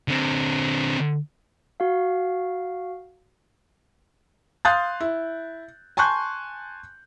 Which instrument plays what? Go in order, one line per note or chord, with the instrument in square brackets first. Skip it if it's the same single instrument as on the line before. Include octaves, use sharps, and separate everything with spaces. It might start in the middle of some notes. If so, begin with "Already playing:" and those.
[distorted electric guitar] D3 C4
[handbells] F#4 F5
[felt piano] F5 C6 D#6 F#6 G6 A6
E4
G#5 A5 C6 C#6 F#6 G6